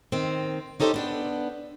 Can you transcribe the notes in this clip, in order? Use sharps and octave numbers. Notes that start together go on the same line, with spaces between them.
D#3 C4
C#4 D#4 G4 A4 A#4 C5
B3 D4 G5